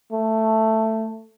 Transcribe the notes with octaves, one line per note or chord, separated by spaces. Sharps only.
A3